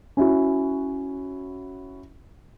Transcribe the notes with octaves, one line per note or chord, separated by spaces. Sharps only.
C#4 E4 F#4